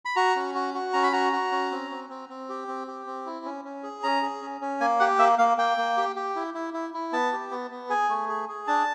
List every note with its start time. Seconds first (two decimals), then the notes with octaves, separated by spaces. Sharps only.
0.05 B5
0.16 F#4 A#5
0.36 C#4
0.55 F#4
0.74 F#4
0.93 C#4 A#5
1.03 B5
1.12 F#4 A#5
1.33 F#4
1.52 C#4
1.71 C4
1.91 C4
2.10 C4
2.29 C4
2.49 G4
2.68 C4
2.87 G4
3.07 C4
3.26 E4
3.45 C#4
3.65 C#4
3.83 G#4
4.03 C#4 A#5
4.22 G#4
4.42 C#4
4.61 C#4
4.80 A#3 G#5
5.00 G4 F#5
5.19 A#3 E5
5.38 A#3 F5
5.57 A#3 G5
5.77 A#3
5.97 G4
6.16 G4
6.36 E4
6.54 E4
6.74 E4
6.94 E4
7.13 B3 A5
7.33 G4
7.51 B3
7.71 B3
7.89 G#4 G#5
8.09 A3
8.29 G#4
8.49 G#4
8.67 D4 A5